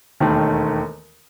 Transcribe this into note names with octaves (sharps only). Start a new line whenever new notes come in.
E1 D#2 D#3 A3